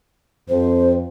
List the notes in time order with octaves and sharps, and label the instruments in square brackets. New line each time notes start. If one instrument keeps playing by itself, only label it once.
[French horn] F2 [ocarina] C5